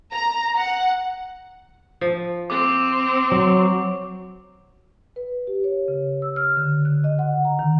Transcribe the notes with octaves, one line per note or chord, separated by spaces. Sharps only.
A#5
F#5
F3
C4 D6
F#3
B4
G4
C#5
C#3
E6
F6
D3
F#6
D#5
F#5
A#5
D#3